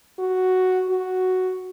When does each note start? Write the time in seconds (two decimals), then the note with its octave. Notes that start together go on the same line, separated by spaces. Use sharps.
0.19 F#4
0.89 F#4